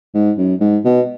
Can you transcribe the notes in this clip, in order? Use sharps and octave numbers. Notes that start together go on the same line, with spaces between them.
G#2
F#2
G#2
B2